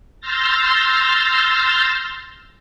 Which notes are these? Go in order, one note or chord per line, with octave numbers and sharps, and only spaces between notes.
C6 E6 F6 G6 A6 A#6